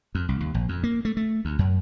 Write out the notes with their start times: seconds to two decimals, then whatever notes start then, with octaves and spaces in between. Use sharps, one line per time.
0.15 F2
0.29 C2
0.41 D#2
0.54 A#1
0.69 F2
0.84 A#3
1.05 A3
1.17 A3
1.45 D2
1.59 F#2